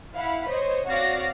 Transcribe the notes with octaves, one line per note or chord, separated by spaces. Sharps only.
E4 F5 F#5 B5
C5 C#5 D#5
C4 F#4 C#5 D5 F5 A#6